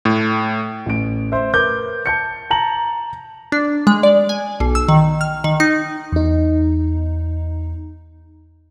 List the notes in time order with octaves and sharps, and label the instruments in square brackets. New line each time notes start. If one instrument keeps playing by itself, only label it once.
[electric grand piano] A2
[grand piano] A1 D7
C5 E5
A#4 B4 D6 G6
A5 G6 C#7
A5 A#5 F#7
[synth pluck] D4
G#3
D5
G#5
B1
E6
D#3
F6
D#3
D#4
[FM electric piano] E2 D#4